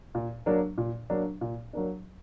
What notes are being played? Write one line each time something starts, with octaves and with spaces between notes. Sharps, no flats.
A#2
F#3 A#3 D4
A#2
F#3 A#3 D4
A#2
F#3 A#3 D4